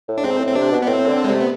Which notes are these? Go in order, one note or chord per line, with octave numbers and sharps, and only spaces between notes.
A2
D4
G#2 C4
A2
C4
C3 D4
B2
B3
A2 C4
D3
G#3
C3 A3
B3